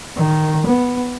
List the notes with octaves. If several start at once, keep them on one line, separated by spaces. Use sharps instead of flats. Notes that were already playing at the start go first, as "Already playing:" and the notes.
D#3
B3